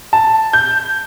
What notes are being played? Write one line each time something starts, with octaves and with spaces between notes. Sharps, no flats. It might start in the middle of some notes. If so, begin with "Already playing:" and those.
A5
G6